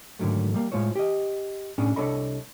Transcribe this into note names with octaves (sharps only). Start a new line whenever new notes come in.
G#2 D3 D#3 F#3 A3
G3 A#3
A2 G#3 F4 C5 C#5
G4 D#5
A2 C#4 D4 G#4
C2 D4 A4 C#5 D#5 B5